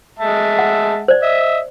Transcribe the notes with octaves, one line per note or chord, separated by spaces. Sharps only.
G#3 E5 A5
F#5
C5 D5
D#5 E5